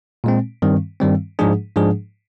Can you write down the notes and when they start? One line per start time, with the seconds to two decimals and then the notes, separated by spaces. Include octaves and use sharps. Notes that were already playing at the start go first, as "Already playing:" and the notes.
0.24 A#2 G#3 C4
0.62 G2 D#3 G3 C4
1.00 G2 D#3 G3 C4
1.39 G#2 F3 G#3 D4 G#4
1.76 G#2 F3 G#3 D4 G#4